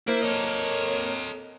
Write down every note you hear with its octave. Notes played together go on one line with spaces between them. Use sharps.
A#3 E4 C5
A4 C#5 D#5